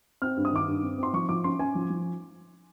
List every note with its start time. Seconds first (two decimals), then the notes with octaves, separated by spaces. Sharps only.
0.22 C4 F6
0.37 G2
0.45 D#6
0.52 D#3 D6
0.68 G2
0.83 C4
0.98 C4 C6
1.13 F3 C#6
1.29 F3 D6
1.44 C#4 C6
1.59 C#4 G#5
1.75 F3
1.90 F3